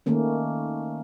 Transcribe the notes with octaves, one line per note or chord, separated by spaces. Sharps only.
D#3 A3 A#3 C#4